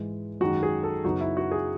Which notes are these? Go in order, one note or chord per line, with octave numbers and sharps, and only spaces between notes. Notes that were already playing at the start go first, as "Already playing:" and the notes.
Already playing: G#2 E3 G#3
F#2 D#3 G#3 D#4 F#4
G#4
A4
F#2 C#3 F#3 B3 D#4 F#4
E4
F#4
G#4